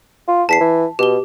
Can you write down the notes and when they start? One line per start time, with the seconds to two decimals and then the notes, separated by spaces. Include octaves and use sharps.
0.28 F4
0.49 E2 A5 B6 C7
0.60 E3
0.99 B2 G4 G7